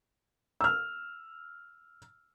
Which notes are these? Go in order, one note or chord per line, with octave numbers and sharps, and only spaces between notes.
E6 F6